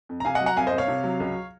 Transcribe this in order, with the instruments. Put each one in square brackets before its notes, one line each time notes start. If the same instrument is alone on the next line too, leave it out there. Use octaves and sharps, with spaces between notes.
[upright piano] F2
A#5
C3 F5 G#5
D#5 F#5
F#3
F#5 A#5
C2 F5 G#5
C5 D#5
C2
C#5 F5
C3
F#3
C#2